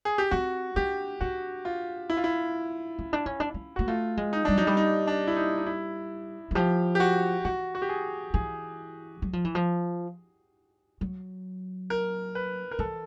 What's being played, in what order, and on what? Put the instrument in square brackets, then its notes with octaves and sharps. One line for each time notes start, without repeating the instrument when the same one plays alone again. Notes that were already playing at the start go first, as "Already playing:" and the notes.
[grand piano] G#4
G4
[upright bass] C4 [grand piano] F#4
[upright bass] D4 [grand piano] G4
[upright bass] D4 [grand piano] F#4
[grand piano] F4
E4
F4
E4
[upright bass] C#4
D4
C#4
D4
C#4
[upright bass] A#3 [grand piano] F#4
[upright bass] A3 [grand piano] F4
[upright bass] G#3
[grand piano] D#4
[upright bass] G3 [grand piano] D4
[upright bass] F#3 [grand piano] D#4
[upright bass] G3
[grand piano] D#4
D4
E4
D#4
D#4
E4
[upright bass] E3
[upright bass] F3 [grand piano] G4
[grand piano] G4
F#4
[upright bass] E3 [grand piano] F#4
[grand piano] F#4
G4
G#4
[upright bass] E3 [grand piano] G#4
[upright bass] F#3
F3
E3
F3
F#3
[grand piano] A#4
B4
A#4
[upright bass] E3 [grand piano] A4